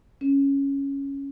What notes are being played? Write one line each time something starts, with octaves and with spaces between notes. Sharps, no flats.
C#4